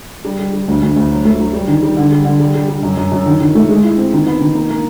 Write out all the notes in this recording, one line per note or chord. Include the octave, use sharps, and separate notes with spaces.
G3
G3
G3
D2
D2
D2
F#3
A3
F#3
G3
D#3
G3
D3
G3
D3
G3
G3
G3
F#2
F#2
F#2
D#3
D#3
A3
G#3
E4
C4
D#3
B3
D#3
A#3
A#3